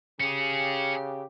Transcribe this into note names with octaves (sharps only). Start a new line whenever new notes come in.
C#3 C#4 G4 G#4